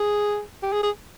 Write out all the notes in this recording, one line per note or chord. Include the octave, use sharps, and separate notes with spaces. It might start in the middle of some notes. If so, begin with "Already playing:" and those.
Already playing: G#4
G4
G#4
G#4